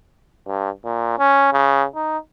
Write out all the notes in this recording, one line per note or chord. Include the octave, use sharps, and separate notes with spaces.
G2
A#2
C#4
C#3
D#4